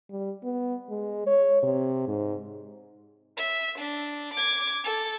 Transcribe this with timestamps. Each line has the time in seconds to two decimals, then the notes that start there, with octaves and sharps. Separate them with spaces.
0.10 G3
0.44 B3
0.90 G#3
1.27 C#5
1.63 C3
2.08 G#2
3.37 E5
3.78 D4
4.34 D6 G#6
4.84 A4